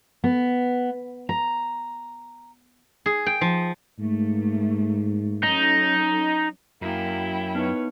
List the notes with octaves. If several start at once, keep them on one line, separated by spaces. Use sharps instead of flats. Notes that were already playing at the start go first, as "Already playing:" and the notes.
B3
A#5
G#4
G5
F3
G#2 A3 A#3
F#3 C#4 D#4 A4
F#2 A#3 E4 F#4 G5
B3 D#4 B4 C#5